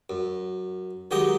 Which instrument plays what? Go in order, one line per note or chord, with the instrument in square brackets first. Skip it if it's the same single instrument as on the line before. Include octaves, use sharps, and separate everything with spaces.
[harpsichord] F#2
D#3 F#3 G#3 G4 D#5